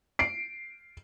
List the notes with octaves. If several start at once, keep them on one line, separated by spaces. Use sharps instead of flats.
C7 D7